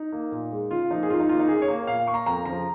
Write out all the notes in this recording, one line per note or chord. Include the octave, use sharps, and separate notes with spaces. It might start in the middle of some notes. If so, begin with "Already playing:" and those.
Already playing: D#4
A#3
A#2
G#3
C#3 F4
F3 A#3 D#4
G#4
G#2 F4
D#4
D#3 A#3 F4
D#4
C#3 G#4
C#5
A#3
A#2 F5
A#3 C#6
A#5
F2 A#5
C#3 F3 A#5